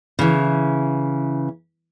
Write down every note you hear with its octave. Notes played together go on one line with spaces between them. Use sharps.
C#3 E3